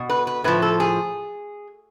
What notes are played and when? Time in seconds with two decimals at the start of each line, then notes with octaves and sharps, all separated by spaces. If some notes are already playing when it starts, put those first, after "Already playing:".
Already playing: B2
0.10 B4
0.27 B4
0.44 A2 F3 B4
0.62 A4
0.80 G#4